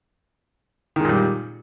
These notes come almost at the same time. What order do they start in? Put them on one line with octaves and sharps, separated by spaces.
D#3 G#3 A#2 G3